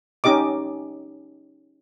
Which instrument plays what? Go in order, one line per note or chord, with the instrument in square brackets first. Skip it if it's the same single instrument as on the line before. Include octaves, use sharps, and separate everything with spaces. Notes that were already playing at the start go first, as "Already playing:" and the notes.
[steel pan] C#4 D#4 G4 D#5 D6